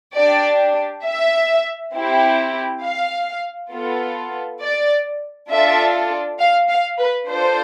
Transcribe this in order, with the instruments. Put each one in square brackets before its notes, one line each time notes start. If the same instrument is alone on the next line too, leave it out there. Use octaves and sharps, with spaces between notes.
[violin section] D4 G4 D5
E5
C4 E4 G4
F5
B3 F4 A4
D5
D4 F4 A4 E5
F5
F5
B4
D4 F4 A4 C5